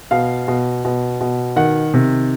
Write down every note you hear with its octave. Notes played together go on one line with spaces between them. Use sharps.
B2 F5
B2
B2
B2
D#3 F#5
C3